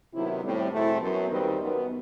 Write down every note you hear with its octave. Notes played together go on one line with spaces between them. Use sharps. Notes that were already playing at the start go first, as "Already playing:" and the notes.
C3 D#3 F#3 B3 E4
A2 G3 C4
E2 B2 A3 C4 E4
F#2 F#3 B3
D#2 D#3 G3 C4 B4 D#5
F#2 D#3 F#3 B3